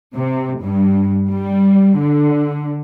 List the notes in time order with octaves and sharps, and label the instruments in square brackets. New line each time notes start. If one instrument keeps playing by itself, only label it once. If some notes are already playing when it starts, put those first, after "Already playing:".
[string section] C3
G2
G3
D3